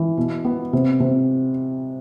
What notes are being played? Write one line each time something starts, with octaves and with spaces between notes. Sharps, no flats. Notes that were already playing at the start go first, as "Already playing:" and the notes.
Already playing: E3
B2
B3
C3
C3